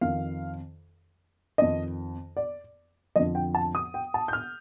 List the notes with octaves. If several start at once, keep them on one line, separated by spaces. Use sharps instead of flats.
F2 D#3 F5
F2 D#3 D#5
D5
F2 D3 F3 D#5
G5
A5
D#6
G5
A5
G6
F6